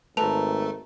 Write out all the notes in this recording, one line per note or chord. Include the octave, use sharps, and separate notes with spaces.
G#1 A3 B4 A5 A#5 F7